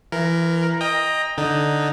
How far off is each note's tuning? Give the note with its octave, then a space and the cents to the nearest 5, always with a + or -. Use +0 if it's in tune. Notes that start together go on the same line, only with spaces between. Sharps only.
E3 +25 A#4 +0
D#5 +0 G5 +25 A#5 +10
D3 +0 D#4 +0